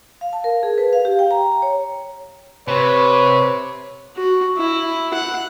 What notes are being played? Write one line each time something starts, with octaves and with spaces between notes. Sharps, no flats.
F5
A5
A#4
G#4
B4
F5
G4
G5
A#5
C#5
C3 B4 C#5
F#4
E4
F#5